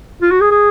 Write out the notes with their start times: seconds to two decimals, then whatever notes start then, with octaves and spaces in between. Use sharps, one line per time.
0.22 F4
0.31 F#4
0.41 G#4
0.51 G#4